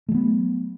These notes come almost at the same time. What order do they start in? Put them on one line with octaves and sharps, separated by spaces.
A3 F#3 B3